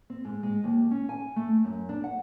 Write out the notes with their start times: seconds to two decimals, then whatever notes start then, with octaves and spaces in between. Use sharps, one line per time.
0.10 C4
0.25 G#2
0.43 G#3
0.64 D#2
0.91 C#4
1.09 G#5
1.36 A3
1.65 F#2
1.89 D4
2.04 F#5